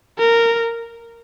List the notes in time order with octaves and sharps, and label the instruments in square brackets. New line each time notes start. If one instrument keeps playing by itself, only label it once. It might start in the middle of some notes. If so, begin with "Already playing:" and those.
[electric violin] A#4